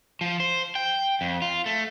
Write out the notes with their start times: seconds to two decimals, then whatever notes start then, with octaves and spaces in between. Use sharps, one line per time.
0.21 F3
0.40 C5
0.75 G5
1.21 F2
1.42 F4
1.66 A3